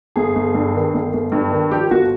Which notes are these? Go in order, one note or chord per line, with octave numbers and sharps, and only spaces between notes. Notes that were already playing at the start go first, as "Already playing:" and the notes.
G1 G#4
G1
G2
D#3
G1
G1
G2
D#3
F3 G4
G1 F#4